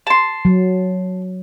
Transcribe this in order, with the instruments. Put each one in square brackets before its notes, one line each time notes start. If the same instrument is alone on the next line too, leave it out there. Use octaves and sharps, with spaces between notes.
[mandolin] A5 C6
[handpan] F#3